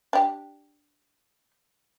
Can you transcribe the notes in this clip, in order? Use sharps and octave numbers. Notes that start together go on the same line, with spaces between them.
D4 G4